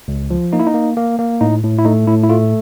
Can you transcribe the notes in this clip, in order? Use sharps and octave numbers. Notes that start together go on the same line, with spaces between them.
C#2
F3
A#3 D#4
E4
D#4
A#3
A#3
A#3
A2 D#4
A2
E4
A3 D#4
A2 E4
E4
A3 F4